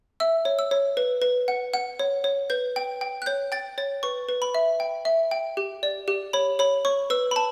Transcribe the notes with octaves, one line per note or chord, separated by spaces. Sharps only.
E5 E6
C#5
E6
C#5
B4
B4
F#5
F#5
C#5
C#5
B4 G6
G5
G5
F#6
C#5 G6
G5 A6
C#5 A6
B4 C#6
B4
B5
E5
G5
E5
G5
G4
D5
G4
C#5 B5
C#5 B5
C#5 C#6
B4 E6
B5
A5